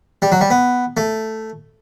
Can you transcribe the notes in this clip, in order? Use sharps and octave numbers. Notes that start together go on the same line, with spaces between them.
G3
F#3
G3
B3
A3